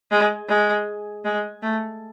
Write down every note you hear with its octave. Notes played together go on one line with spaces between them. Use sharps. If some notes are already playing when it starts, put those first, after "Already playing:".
G#3
G#3
G#3
A3